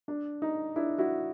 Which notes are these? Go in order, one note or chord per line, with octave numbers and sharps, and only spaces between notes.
D4
D#4
D4 E4
E4 F#4